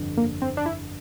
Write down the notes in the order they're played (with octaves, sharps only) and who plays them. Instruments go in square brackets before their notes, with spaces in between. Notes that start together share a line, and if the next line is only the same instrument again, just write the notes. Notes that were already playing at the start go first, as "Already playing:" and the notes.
Already playing: [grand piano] G1 F2 D3
[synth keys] A#3
C4
D4
E4